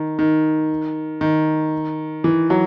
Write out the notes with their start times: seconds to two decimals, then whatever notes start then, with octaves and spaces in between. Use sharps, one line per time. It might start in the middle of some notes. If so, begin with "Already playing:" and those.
Already playing: D#3
0.19 D#3
1.21 D#3
2.24 E3
2.50 F#3